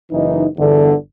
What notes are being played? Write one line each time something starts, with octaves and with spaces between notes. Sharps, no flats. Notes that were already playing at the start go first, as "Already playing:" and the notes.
F#1 E3 D#4
G1 E2 D3